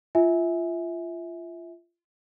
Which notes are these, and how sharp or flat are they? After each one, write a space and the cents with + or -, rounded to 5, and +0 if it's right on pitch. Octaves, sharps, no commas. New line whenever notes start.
F4 -25 E5 -20 G#5 +0